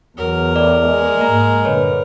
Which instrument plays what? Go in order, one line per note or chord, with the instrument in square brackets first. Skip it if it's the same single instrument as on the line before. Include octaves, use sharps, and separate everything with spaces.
[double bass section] E2 [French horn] F#3 [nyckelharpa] A#4
[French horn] A2 [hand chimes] D5
[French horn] G#3
[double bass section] G#2 A#3 [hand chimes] A#5
[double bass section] G2 A#2 D3 [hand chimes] B4 C#5